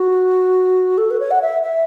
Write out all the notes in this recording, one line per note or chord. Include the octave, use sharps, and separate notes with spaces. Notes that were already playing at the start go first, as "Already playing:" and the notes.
Already playing: F#4
A4
B4
C#5
F#5
E5
E5